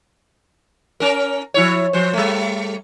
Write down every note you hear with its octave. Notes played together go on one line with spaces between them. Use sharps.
C#4 A#4
F3 E4 C#5
F3 C5
G3 A3